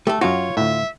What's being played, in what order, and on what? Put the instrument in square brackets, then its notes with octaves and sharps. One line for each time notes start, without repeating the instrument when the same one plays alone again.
[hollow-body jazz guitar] A3 A4 [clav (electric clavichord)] G4
[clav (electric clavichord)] F#2 F#4 [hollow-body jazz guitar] F4 [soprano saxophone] C#5
[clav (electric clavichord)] D2 A2 [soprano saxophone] E5